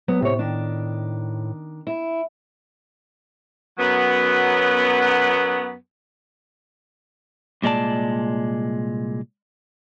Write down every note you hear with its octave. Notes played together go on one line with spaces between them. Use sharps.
F#3 B3
A2 C3 C#5
D#3 D4
E4
F#2 F#3 B3
C2 A#2 G#3 D5 A5